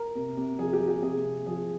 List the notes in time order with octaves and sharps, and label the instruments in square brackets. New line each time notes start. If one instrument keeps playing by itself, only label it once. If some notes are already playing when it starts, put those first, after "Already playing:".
Already playing: [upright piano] A#4
C3
C3
F3 G#4
G4
F3
G4
C3 G#4
C3
F3 G#4